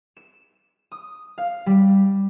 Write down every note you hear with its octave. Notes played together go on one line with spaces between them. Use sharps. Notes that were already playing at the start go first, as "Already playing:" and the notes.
E7
D#6
F5
G3